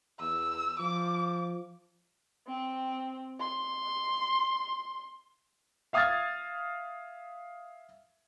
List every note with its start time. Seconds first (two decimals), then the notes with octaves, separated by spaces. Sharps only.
0.20 E2 E6
0.79 F3 D6
2.48 C4
3.40 C6
5.93 E5 F5 D#6 F6 G#6 A6